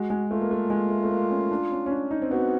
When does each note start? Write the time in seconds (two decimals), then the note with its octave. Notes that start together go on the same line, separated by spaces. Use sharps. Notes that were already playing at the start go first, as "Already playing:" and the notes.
Already playing: G#3 F#4
0.10 G#3
0.31 A3 F4
0.41 A#3
0.51 A3
0.70 G#3
0.90 A3
1.04 A3
1.11 A#3
1.31 C#4
1.51 D4
1.71 C#4
1.86 C#4
1.91 D4
2.11 D#4
2.22 C4
2.31 B3 F#4